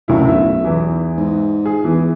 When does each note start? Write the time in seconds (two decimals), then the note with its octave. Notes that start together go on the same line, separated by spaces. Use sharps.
0.08 F#1 D2 A2 E4
0.29 B1 E5
0.65 E2 E3
1.17 G#2
1.66 G#4
1.84 E2 E3